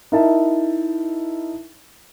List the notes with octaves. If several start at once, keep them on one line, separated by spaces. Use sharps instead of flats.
D#4 E4 A#4 E5 A5